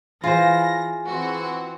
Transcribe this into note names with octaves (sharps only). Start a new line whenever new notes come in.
E3 F4 G#4 C5 G#5 A#6
E3 C4 F#4